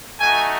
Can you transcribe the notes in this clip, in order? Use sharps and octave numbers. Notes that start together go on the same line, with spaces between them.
A3 D#4 F#4 G#5